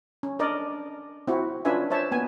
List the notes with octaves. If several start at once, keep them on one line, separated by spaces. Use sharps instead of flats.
C#4
D4 A#4 D5 D#5
C4 E4 F#4
C#4 D4 F4 B4 E5 G#5
C5 C#5 E5 A5
A#3 B3 G#5